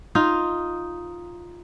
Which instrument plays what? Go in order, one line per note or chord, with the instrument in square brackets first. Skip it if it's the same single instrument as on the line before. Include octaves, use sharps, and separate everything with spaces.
[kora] D#4 F4